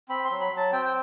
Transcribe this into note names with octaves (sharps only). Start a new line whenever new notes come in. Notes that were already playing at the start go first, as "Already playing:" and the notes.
C4 B5
C6
F#3
B5
F#3 A5
C4 G5
G5